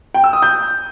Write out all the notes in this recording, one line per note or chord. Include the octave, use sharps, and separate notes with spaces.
G5
E6
D#6
G6